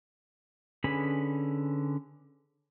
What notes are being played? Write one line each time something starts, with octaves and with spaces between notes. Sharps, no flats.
D3 C#4 G#4 B4 B5